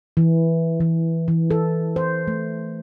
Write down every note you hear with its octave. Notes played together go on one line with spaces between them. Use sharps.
E3
E3
E3
A4
C5
A3